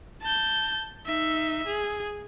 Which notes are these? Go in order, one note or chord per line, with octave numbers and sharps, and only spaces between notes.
A5 G6
D#4 E5
G#4